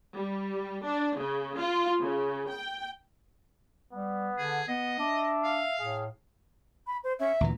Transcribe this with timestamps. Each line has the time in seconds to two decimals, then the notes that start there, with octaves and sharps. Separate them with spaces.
0.16 G3
0.87 D4
1.19 C#3
1.58 F4
2.03 C#3
2.52 G5
3.93 G3 B3
4.38 D3 G#4
4.69 B3 D#5
4.99 D4 E5
5.44 F5
5.79 A2 G#4
6.87 B5
7.04 C5
7.19 C#4 E5
7.41 D2 A#2 E3 A#5